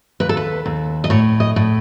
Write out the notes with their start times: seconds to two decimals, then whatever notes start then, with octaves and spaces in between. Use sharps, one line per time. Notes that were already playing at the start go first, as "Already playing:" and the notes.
0.20 D#2 B4
0.29 A4
0.37 B4
0.66 D#2
1.04 D#5
1.10 A2 C#5
1.40 D#5
1.56 A2